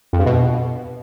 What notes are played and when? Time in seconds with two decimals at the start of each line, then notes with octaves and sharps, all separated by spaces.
0.13 F2
0.19 G2
0.26 B2